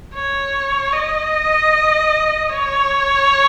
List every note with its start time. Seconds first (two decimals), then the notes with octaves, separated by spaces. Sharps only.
0.14 C#5
0.93 D#5
2.49 C#5